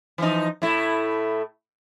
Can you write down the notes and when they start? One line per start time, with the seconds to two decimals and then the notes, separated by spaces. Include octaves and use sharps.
0.18 E3 F3 D#4
0.62 A2 A3 E4